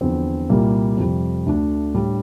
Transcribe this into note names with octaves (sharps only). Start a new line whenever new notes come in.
E2 D3 F3 C4
C2 A#2 G3 A#3
F2 C3 G3
D2 D3 A3 D4
A2 G3 D4